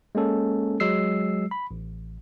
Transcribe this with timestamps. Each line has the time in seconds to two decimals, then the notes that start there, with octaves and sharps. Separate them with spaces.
0.15 G#3 A#3 C#4 A4
0.80 F#3 G#3 E6 C7
1.51 B5
1.71 A1